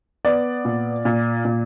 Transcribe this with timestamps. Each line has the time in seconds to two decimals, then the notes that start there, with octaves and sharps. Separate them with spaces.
0.25 B3 D5
0.65 A#2
1.05 A#2
1.45 A#2